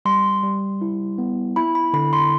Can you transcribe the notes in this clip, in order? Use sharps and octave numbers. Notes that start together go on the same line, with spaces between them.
G3 C6
G3
E4
B3
E4 B5
B5
D3 B5
C6